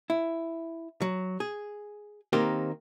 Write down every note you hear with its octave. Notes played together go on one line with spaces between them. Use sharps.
E4
F#3
G#4
D#3 A#3 C4 G4